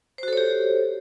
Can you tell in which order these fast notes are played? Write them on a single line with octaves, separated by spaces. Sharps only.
C5 F#4 A4 C#5 G4